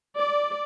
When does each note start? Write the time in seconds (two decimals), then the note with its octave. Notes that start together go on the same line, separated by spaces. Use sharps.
0.17 D5